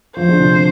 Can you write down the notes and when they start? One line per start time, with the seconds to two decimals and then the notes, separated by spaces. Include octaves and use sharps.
0.17 F3 C5
0.29 D3
0.39 C3
0.50 D3